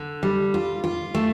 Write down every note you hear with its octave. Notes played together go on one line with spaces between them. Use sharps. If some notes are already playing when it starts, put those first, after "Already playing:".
Already playing: D3
G3
F4
F4
A3